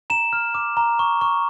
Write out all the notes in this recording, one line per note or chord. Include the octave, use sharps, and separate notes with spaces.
A#5 E7
F6
D6
A#5
C#6
C#6